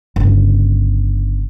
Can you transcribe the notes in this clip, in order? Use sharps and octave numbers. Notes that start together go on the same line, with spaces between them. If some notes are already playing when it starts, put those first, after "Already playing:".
G1 C#3